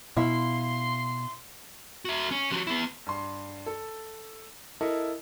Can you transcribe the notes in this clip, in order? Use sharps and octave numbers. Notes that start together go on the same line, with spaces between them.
B2 E4 F5 C6
F#4 E5
C#4
F3 F#4
B3 E4
G2 C6
A4
E4 A4 A#4 D#5